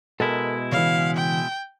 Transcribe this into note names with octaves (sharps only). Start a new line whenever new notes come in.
B2 G#3 E4 A4 A#4
C#3 E3 F5
G5